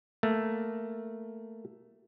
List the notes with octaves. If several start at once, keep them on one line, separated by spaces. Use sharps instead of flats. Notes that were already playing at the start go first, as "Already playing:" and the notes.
A3 A#3